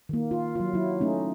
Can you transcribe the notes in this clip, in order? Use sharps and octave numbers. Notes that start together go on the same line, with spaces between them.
D#3 A#3
F4
F#3 F4
F#3 E4
A3 C#4 D#4